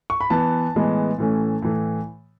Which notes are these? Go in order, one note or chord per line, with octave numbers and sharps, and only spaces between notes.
C#6
B5
E3 B3 A5
A2 E3 G#3 B3
A2 E3 A3 C#4
A2 E3 A3